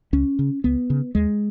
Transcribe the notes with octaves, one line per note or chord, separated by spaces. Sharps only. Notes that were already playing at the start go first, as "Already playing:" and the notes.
C#2 C#4
C#3
C#2 B3
C#3
D#2 G#3